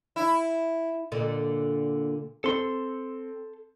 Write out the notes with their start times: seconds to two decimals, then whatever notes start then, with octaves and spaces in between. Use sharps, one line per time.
0.16 E4
1.12 A#2 D3
2.44 C4 A4 C6